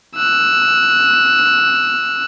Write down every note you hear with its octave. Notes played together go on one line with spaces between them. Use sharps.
E6 F#6